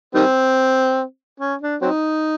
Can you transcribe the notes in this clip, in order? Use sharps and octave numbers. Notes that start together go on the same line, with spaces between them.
D#3 G3 C4
C#4
D4
F#3 C4 D#4